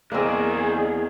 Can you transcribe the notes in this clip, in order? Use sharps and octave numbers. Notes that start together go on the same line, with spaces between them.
E2 D3 A#3 C4 G#4 D#5